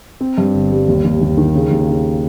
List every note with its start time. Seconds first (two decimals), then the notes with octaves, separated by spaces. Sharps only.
0.21 C4
0.38 G2
0.54 G1
0.71 G3
0.88 D#2
1.04 D#2
1.21 D#2
1.37 D#3
1.55 C#3
1.71 D#2
1.88 C#3